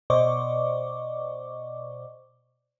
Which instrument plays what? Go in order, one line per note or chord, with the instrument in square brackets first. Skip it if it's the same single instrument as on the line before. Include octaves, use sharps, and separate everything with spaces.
[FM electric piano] B2 C5 D5 D#5 C#6 D6